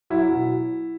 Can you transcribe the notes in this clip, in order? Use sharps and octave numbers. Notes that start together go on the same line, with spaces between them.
F#3 E4
B2